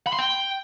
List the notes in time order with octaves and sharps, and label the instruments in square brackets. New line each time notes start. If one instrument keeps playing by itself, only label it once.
[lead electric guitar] B5
C6
G5